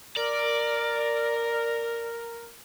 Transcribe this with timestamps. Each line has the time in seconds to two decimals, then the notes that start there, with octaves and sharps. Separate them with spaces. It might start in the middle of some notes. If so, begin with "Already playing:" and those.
0.17 A#4 D5